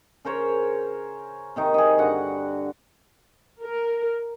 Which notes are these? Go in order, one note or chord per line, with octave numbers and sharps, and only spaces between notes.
C#3 A#4 C5 C#5
C3 D#3 D#4
D#4 G#4
G2 D3 F#4 F#5
A#4